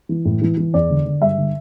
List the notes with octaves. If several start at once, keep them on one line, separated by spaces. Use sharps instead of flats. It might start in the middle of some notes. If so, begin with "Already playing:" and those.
E3
A2
E3
E3
E2 D5
D3
D3
G2 E5
D3